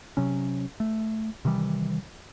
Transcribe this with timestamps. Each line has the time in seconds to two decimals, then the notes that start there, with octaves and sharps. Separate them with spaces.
0.17 C3 F#3 C#4
0.80 A3
1.45 C3 D#3 E3 G3